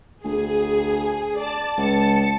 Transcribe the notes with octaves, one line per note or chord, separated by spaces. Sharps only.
D2 G#4
D5 A5
C#2 A5 C#7